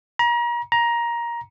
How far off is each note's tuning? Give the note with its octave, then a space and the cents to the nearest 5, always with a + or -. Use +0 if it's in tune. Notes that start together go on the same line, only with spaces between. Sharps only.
A#5 +35
A#5 +15